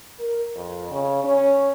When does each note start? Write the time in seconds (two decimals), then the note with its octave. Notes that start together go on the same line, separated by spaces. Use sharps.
0.19 A#4
0.55 F2
0.91 C#3
1.24 C#4